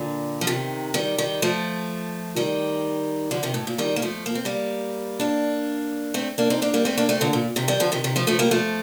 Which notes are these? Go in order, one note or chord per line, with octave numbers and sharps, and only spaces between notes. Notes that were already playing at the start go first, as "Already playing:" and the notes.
Already playing: A#2 D3
F3
C3 D#3
D#3 G3
D#3 G3
F3 A3
D#3 G3
D3 F3
C3 D#3
A2
A#2
D#3 G3
A#3
F3 A3
A#3
C4
G3 A#3
A#3 D4
A3 C4
A#3 D4
C4 D#4
A#3 D4
G3 A#3
A3 C4
A#3 D4
A3 C4
A#2 D3
A#2
C3 D#3
D#3 G3
D3 F3
C3 D#3
C3 D#3
F3 A3
F3 A3
G3 A#3
F3 A3